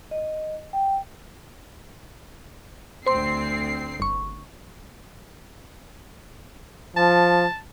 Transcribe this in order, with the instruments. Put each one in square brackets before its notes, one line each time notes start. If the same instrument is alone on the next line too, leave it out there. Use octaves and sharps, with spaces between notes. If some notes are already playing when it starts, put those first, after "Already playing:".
[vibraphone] D#5
G5
[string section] D2 C4 C7 [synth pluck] C5 C6
[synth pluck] G1 C#6
[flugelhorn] F3 [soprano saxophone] A5